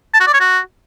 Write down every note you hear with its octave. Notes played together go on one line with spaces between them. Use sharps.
A5
F#4
D5
C#5
F#4